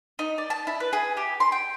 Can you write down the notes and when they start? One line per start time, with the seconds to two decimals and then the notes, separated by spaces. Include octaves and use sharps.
0.19 D#4
0.38 D5
0.50 A5
0.67 E4
0.80 B4
0.93 G#4
1.17 G4
1.40 C6
1.52 G5